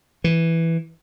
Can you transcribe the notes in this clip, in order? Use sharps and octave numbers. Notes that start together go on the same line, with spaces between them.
E3